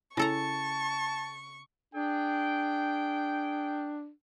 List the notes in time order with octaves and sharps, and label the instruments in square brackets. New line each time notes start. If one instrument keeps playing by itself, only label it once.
[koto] C#3 A4 A#5 [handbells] E4 A#6 [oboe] A5 [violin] C#6
[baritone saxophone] D4 [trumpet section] G#4 G5